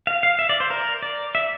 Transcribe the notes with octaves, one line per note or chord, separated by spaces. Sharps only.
F5
F5
E5
D5
C5
A#4
D5
E5